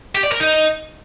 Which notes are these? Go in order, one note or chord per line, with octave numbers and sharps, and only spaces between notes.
G4
D5
A#4
D#4